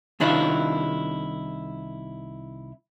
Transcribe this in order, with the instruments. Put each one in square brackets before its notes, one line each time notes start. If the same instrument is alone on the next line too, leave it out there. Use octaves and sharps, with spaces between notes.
[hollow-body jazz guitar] C2 D#3 D4 E4 F4 E5